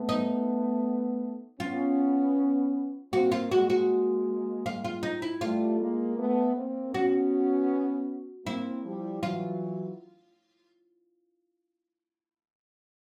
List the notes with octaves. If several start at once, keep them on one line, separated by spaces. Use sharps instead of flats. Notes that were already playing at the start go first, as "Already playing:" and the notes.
Already playing: A3 B3
D#4
B3 C#4 F4
A#3 C4 F#4
F4
G#3 A#3 F#4
F#4
F4
F4
D#4
E4
G3 A3 F4
G#3 A#3
A3 B3
A#3 C4
B3 C#4 F#4
A#3 C4 E4
F3 G3
E3 F#3 F4